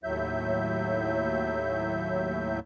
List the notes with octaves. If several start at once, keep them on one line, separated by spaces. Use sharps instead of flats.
D#2 A2 F#3 E5 G6